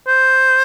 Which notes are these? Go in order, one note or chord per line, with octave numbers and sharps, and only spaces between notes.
C5